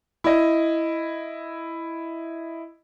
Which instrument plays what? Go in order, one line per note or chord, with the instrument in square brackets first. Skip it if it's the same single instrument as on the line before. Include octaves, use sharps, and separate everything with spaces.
[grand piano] E4 D#5